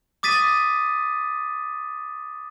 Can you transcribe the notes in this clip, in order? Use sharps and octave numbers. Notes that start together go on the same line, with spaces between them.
D6 D#6 A6 B6 D#7